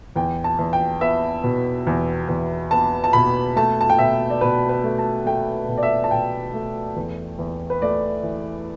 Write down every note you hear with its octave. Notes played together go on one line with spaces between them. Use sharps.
E2 G5
A5
E2
G5
B3 E5
B2
E2
E2
B3 A5
A5
B2 B5
A3 A5
A5
G5
B2 E5
D5
B2 B4
B4
A3
A5
A3 G5
B2
D5
E5
A5
B2 G5
A3
E2
E2
B4
A3 D5
E3